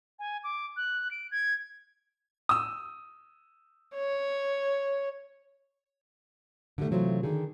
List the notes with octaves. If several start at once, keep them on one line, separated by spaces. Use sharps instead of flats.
G#5
D6
F#6
D7
G#6
D#6 E6
C#5
D3 G3 A3
C3 E3 F#3 A3 F4 C5
D3 D#3 G#4